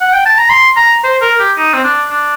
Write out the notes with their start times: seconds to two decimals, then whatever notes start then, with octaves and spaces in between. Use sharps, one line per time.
0.01 F#5
0.13 G5
0.26 A5
0.38 A#5
0.50 C6
0.77 A#5
1.04 C5
1.21 A#4
1.39 G4
1.57 D#4
1.73 C4
1.84 D4
2.11 D4